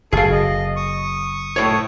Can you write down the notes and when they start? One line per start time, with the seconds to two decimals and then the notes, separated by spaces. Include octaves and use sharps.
0.13 F#1 G#4 A4 F5
0.32 D#5
0.76 C#6 D#6
1.56 A2 C#5